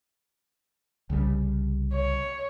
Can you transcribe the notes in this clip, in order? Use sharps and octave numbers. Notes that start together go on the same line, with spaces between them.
C2 C#3 G3
C#5